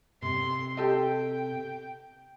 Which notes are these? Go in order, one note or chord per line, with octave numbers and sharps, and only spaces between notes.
C3 C6
G4 A4 D#5 G5